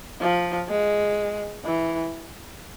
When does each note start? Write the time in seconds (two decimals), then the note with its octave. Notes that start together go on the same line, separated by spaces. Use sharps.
0.21 F3
0.69 G#3
1.65 E3